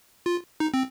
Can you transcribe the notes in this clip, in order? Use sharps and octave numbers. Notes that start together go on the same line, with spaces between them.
F4
D#4
C4